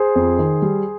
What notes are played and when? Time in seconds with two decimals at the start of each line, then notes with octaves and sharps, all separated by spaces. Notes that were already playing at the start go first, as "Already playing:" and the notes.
Already playing: G#4 C5
0.16 F2
0.39 D#3
0.62 G3